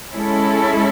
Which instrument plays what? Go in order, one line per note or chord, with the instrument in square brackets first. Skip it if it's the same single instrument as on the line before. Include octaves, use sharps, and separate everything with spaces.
[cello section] G#3 C#4 E4 A4